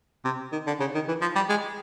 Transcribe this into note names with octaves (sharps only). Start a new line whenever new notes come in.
C3
D#3
D3
C#3
D#3
E3
F3
G3
G#3